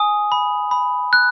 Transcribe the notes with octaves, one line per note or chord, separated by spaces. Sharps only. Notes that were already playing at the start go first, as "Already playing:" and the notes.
Already playing: G#5 D#6
B5
B5
F#6